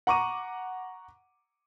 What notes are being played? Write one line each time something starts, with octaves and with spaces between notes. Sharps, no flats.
F#5 A#5 C#6 D6 D#7